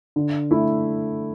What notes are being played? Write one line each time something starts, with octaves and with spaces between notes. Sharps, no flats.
D3
A3 E4